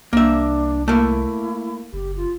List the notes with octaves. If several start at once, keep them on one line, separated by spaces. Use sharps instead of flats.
C2 A#3 D4 E5
A3 A#3 E4
F#1 G4
F4